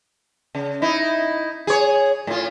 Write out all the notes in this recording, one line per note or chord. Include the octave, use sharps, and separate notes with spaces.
C#3
D#4 E4
G#4 C#5
A2 F4